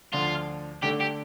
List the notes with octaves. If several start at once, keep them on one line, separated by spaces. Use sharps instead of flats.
D2 D3 F3 D4 F4
D3 A3 D4 G4
G4